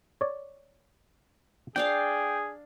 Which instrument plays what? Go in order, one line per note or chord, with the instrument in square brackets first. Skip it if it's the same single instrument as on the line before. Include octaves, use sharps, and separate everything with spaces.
[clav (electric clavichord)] C#5 D5
[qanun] D4 D5 F5 [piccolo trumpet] G#4 [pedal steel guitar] G5